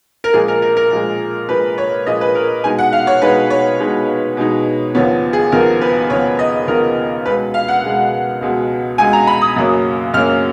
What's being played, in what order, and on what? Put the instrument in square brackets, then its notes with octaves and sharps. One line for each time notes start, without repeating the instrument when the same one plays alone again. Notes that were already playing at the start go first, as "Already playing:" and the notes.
[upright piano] A#4
A#2 F3 G#3 G#4
A#4
A#4
A#4
A#2 F3 G#3
A#2 F3 G#3 B4
C#5
A#2 F3 G#3 D#5
B4
A#4
B2 G#3 D#4 G#5
F#5
F5
C#5
B2 G#3 D#4 B4
C#5
B2 G#3 D#4
B2 G#3 D#4
D#2 C#3 F3 B3 C#5
G#4
D#2 C#3 F3 B3 A#4
B4
D#2 C#3 F3 B3 C#5
D#5
D#2 C#3 F3 B3 A#4
C#2 B2 G#3 B4
F5
F#5
C#2 B2 G#3
C#2 B2 G#3
C#2 B2 G#3 G#5
A#5
B5
D#6
F#2 C#3 F#3 A#3 C#4
F#2 C#3 F#3 A#3 C#4 F6